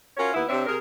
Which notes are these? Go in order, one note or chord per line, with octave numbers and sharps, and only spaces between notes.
C#4 F4 F#4 A#4 C#5
D#2 B3 E4
C3 C4 D4 C#5 E5
C3 G#4 A#4